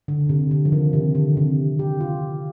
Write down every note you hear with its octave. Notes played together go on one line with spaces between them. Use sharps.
D3
C3
D3
F3
D#3
C3
D3
C3
G4
F4